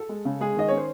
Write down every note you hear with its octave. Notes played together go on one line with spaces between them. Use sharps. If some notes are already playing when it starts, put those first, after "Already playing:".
Already playing: A4
G#3
C#3
G#3 G#4
D#3 D#5
C#4 C#5
C5